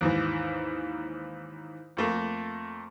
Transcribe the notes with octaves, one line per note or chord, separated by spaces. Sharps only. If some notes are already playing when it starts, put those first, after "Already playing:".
D#2 G#2 E3
F2 A3 A#3